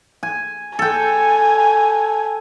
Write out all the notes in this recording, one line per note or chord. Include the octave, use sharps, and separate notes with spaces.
G#5
A4 G5 G#5